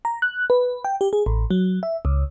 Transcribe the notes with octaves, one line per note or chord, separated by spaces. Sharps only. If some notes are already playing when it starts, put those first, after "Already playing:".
A#5
F#6
B4
G5
G4
G#4
A1
F#3
E5
C#2